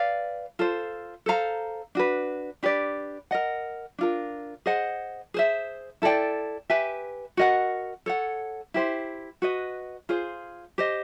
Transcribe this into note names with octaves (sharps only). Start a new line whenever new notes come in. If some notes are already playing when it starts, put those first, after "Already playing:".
Already playing: B4 D5 F5
F4 A4 C5
A4 C5 F5 A#5
D4 F#4 B4
D4 G4 B4 D5
A#4 D#5 F#5
D4 F4 A#4
G#4 C5 D#5 F#5
G#4 C5 E5
E4 A4 D5 G5
G4 B4 E5 G#5
F#4 A#4 D#5 F#5
A4 C#5 F#5
E4 G4 C5
F#4 B4 D#5
F4 G#4 C5
G4 C5 D#5